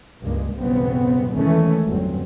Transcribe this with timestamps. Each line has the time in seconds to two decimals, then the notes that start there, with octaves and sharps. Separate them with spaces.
0.22 C#2 G2 G#3 A#3
0.56 B1 E2 G2 C#3 B3 C4
1.32 E2 D#3 E3 G#3 A3 C#4
1.86 G1 E2 F#3 C4